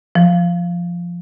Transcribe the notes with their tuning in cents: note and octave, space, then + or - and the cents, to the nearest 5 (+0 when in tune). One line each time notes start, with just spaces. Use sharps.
F3 -5